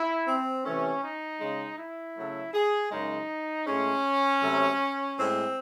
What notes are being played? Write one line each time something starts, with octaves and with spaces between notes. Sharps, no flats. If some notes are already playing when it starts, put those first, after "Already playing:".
Already playing: E4
C4
C3 E3 A3 C#4
D#4
C#3 G#3
E4
C#3 F#3 A3
G#4
F#2 C#3 G#3 D#4
A2 G#3 C#4
C3 F#3 A3
A2 G#3 C4